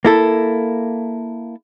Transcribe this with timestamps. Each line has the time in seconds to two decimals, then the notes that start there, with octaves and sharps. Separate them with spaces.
0.05 A#3 E4 A4